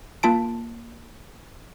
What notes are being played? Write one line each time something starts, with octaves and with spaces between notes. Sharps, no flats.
A#3 F4 A5 D7